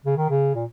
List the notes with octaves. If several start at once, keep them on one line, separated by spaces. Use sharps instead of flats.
C#3
D#3
C#3
A#2